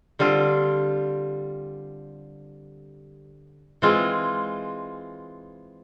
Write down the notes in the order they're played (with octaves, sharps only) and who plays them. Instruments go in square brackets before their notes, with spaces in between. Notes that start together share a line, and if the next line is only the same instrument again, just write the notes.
[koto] D3 G3 C4 F4
E3 G#3 C4 F4